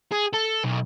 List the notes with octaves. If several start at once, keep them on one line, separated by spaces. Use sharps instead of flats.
G#4
A4
B1